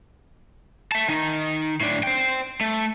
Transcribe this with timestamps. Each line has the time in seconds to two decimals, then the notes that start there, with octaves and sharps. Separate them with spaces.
0.92 E5 A5
1.08 D#3 D#4
1.80 A2 D4
2.03 C5 G5
2.61 A3